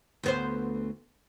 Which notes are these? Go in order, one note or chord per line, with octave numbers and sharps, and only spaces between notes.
D2 B3 C5